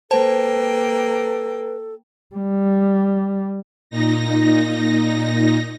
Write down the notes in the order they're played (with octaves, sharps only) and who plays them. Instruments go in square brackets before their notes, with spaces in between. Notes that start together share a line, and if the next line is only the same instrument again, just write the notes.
[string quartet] A#3 G5 [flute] A4 [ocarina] B4 [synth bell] C5 A5
[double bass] G3
[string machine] A#2 D#4 A#6